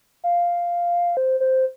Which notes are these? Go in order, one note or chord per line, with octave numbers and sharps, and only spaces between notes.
F5
C5
C5